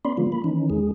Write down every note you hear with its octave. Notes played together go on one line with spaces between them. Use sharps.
B3 C#4 D5 B5 C6
D3 F3 G#3 B3 F4
A#3 B5
D#3 E3 C#4 D#4
E2 G#3 G#4